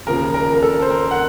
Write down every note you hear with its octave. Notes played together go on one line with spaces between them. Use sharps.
D#2 C#3 F3 A#4
A#4
A#4
A4
C5
A#4
F#5